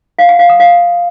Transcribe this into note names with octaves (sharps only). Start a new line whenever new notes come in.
F5
F#5
F5
D#6
F5